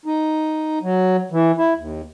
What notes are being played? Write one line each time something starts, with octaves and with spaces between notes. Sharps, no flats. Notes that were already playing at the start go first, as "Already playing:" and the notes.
D#4
F#3
E3
E4
D#2